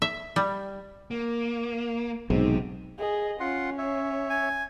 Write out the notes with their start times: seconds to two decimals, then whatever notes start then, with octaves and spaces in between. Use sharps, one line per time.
0.02 E5
0.36 G3
1.11 A#3
2.30 B1 G#2 C3
2.99 G#4 D#5
3.40 C#4 F4 F#5 C6
3.78 C#5 E5
4.30 G#5